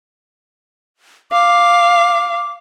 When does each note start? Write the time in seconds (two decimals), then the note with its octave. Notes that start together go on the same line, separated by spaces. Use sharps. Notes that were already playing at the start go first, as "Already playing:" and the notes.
1.32 F5 D6